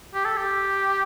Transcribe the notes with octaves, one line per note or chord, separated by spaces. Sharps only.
G4
A4
G4